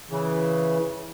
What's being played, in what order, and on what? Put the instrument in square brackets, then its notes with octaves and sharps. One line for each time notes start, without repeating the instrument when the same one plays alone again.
[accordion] C#3 E3